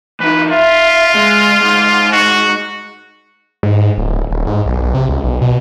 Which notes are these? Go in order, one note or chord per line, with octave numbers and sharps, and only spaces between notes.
E3 D#4 B4
F4 E5
G#3
G#2
F#4
G#2
G#2
D1
D#1
G#2
B1
B1
C3
C#2
B1
B2